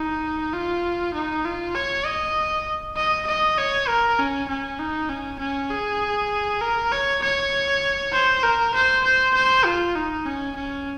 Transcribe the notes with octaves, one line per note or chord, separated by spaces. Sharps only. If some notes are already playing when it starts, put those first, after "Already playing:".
Already playing: D#4
F4
D#4
F4
C#5
D#5
D#5
D#5
C#5
A#4
C#4
C#4
D#4
C#4
C#4
G#4
A#4
C#5
C#5
C5
A#4
C5
C5
C5
F4
D#4
C#4
C#4